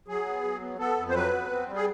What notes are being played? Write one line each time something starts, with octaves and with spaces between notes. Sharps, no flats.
F#3 G#4
B3
F#3
B3
B3 A4
F2
C5
F#3 B4
B3
C4
G3
G#4